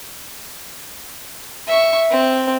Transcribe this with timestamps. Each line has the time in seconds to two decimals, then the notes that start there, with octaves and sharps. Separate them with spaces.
1.67 E5 C#6
2.10 C4